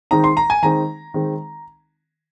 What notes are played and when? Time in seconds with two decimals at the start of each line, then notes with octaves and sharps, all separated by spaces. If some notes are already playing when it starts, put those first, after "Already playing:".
0.11 D#3 G#3 C4 D#4 A#5
0.24 C6
0.37 A#5
0.50 G#5
0.62 D#3 G#3 C4 D#4 A#5
1.14 D#3 G#3 C4 D#4